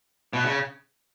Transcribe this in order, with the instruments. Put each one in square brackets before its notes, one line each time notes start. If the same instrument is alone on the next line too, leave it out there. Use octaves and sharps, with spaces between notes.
[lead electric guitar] B2
C#3